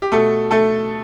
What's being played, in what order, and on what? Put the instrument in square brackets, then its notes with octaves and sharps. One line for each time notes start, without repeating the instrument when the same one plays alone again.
[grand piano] G4
B2 A3 A4
A3 A4